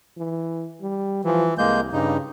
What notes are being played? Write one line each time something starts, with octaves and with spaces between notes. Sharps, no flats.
E3
G3
E3 F3
C2 G#3 A#3 G6
G2 C#3 D#4